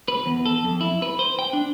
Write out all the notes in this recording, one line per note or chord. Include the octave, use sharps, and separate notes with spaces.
B4
E2
A4
F2
E4
B4
C5
G5
D4